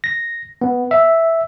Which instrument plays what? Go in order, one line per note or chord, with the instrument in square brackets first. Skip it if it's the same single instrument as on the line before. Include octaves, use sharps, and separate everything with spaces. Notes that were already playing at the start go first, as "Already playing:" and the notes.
[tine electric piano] A#6
B3
E5